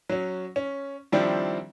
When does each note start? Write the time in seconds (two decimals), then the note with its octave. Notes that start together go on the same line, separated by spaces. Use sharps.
0.09 F#3 C#4
0.56 C#4
1.12 D#3 F3 G3 C4 D4 E4